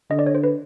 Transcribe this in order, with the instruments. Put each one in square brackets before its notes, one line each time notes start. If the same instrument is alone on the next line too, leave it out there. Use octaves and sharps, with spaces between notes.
[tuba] D3 [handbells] D#5
[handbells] D5
C#5
C5
B4